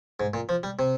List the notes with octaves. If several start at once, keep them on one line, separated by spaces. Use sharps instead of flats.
G#2
A#2
F3
G3
C3